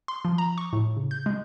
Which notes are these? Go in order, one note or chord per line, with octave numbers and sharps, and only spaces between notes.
C6
F3
A#5
C#6
A2
C#3
G6
G#3